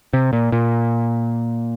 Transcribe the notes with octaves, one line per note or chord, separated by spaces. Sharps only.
C3
A#2
A#2